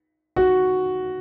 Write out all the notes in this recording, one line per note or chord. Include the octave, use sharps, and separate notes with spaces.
F#4